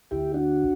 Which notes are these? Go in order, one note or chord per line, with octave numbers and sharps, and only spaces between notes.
D2 E4 G4
D4 F#4